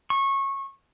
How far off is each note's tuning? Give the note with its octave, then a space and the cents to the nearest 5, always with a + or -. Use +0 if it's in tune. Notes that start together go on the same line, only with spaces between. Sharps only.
C#6 -20